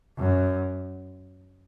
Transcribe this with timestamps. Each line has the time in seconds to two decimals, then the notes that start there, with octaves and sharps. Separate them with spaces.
0.18 F#2